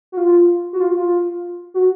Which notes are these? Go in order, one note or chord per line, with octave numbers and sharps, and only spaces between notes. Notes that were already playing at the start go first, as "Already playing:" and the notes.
F#4
F4
F#4
F4
F4
F#4